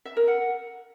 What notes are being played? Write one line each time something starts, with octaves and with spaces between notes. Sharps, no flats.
E5
A#4
F#5